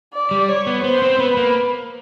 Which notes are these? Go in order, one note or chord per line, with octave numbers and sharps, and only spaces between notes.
D5
G3
C#5
B3
B3 C5
C4
B3 B4
A#3